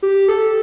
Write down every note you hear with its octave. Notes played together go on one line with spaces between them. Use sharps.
G4
A4